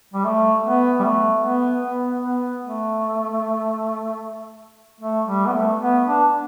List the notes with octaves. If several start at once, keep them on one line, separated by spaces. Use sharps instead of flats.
G3
A3
B3
G3
A3
B3
B3
B3
A3
A3
G3
B3
A3
B3
D4